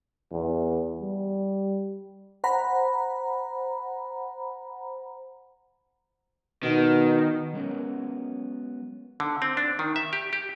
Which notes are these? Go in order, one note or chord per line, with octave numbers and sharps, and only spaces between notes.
E2
G3
C5 F#5 A#5 B5
B2 D#3
F#3 G#3 B3 C#4 A#4
D3
C4
D4
D#3
E5
G4
G4